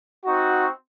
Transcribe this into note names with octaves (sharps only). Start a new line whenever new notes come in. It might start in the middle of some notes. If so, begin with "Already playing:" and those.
C4 D#4 F#4